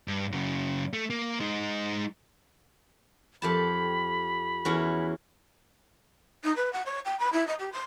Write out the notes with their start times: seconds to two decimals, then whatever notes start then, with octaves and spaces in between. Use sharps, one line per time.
0.08 G2
0.32 F#2 C#3
0.93 A3
1.10 A#3
1.40 G#3 D#4
3.42 F2 G4 A5 B5
4.65 E2 C#4 F#4
6.44 D#4
6.56 B4
6.73 F#5
6.86 C#5
7.05 G5
7.19 B5
7.32 E4
7.47 D#5
7.59 G4
7.72 C6